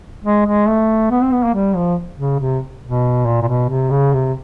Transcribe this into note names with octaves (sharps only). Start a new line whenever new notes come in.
G#3
G#3
A3
B3
C4
B3
A#3
G3
F3
C#3
C3
B2
A#2
A#2
B2
C3
C#3
C3